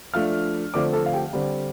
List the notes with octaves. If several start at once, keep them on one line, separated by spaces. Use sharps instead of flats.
F3 A3 D4 F5 F6
D3 F3 A3 C4 D5 D6
A4 A5
F5
G4 G5
D3 G3 C4